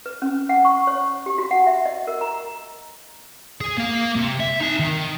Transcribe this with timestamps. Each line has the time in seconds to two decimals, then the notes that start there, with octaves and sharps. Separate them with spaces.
0.06 B4
0.22 C#4
0.49 F#5
0.65 C#6
0.87 C#5
1.26 G4
1.38 F#4
1.51 F#5
1.67 E5
1.86 D#5
2.07 A#4
2.21 A#5
3.61 G#4
3.78 A#3 F5
4.16 C3
4.40 E5
4.60 D#4 A5
4.79 D#3